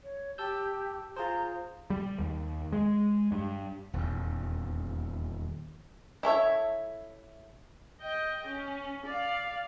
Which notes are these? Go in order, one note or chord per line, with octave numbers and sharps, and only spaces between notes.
C#5
G4 A5 E6 G6
F4 G#4 C5 A#5
G3
D#2
G#3
G2
D#1 E2
E4 A4 C#5 E5
D#5 G5
C#4
D5 F5